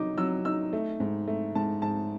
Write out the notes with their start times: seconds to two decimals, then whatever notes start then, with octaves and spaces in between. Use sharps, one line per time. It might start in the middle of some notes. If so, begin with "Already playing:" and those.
Already playing: D#3 F#3 D#4 D6
0.18 F#3 E6
0.45 D#4 E6
0.73 A3
1.00 G#2
1.28 A3
1.55 G#2 A5
1.82 G#2 A5